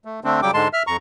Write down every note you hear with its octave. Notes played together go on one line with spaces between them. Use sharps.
A3
D3 A3 C4 D4
C#3 F#3 G3 G5 D6
G#2 D3 G#3 A5 C6
E5 F6
F2 A#5 C#6